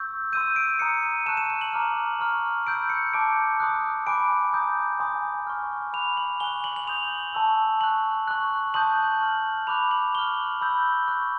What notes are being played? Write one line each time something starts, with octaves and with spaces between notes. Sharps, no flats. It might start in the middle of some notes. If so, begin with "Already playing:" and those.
Already playing: C#6 E6 G6
C6 E6 G6 D#7
D7
A#5 D#6 F#6 C#7
D#7
A5 C#6 F#6 E7
E7
E7
F#7
A#5 D6 F6
A#5 C#6 F6
B5 E6 G6 D7
C#7
A5 D6 G6 D7
C6 D#6 F#6
G#5 B5 D6 F#6 D7
A#5 D#6 G6
G#5 C6 D#6
C#6 F6
B5 D6 F#6 F7
F#7
G#5 C#6 F#6 G7
F#7
F#7
C6 D#6 G6 F7
A5 C#6 E6
C#6 F#6 F#7
C#6 F#6
A5 C6 D#6 G6 F#7
C#6 F6
B5 D6 F#6 F7
F#7
C#6 F6 G7
B5 E6 G6
C#6 F#6